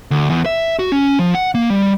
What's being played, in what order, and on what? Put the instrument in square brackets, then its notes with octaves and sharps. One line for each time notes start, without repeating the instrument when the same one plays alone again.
[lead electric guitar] D2
E2
E5
F#4
C#4
F3
F#5
A#3
G3